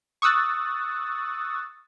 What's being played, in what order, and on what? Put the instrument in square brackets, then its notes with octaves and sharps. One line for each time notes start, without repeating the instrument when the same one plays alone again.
[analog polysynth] C#6 D#6 E6 F#6 A6